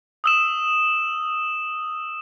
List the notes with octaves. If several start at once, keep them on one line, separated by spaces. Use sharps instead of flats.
D#6 E6 E7